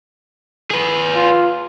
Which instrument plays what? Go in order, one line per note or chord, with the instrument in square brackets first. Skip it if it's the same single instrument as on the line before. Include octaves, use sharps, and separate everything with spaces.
[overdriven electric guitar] G#4 B4
[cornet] F4